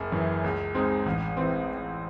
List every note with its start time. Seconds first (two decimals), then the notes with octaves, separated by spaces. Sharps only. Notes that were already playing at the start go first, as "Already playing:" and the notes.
Already playing: F#1
0.12 F#2 E3
0.44 C#2
0.75 C#3 G#3 C4 D#4
1.06 A1
1.37 E3 C4